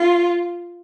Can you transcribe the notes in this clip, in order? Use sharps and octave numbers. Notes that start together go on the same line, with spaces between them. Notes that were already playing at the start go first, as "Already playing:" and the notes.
Already playing: F4